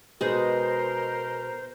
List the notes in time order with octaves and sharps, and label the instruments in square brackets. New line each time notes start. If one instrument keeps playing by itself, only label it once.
[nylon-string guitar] B2 [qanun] G#3 D#4 G#4 [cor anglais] A#4 [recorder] C5